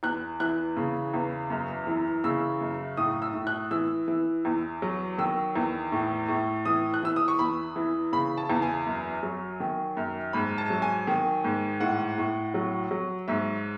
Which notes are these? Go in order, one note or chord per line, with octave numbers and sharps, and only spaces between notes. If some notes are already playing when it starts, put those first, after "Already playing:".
E2 F#6
E3 F#6
C#3
E2
F#2
E3
C#3 E6
F#2
A2 D#6
E6
A2
F#6
E3 E6
E3
E2
F#3
D#3 E6
E2
A2
A2
E3 D#6
F#6
E3 E6
D#6
C#6
E2 B5
E3
C#3 B5
A5
E2
G#5
F#2
F#3
D#3
F#2
G#2 B5
A5
F#3
G#5
D#3
G#2
A2 F#5
A2
F#3
F#3
G#2 E5